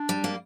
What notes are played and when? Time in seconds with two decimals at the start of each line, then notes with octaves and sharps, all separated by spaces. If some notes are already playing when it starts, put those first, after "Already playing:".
Already playing: D4
0.09 G3
0.24 A#3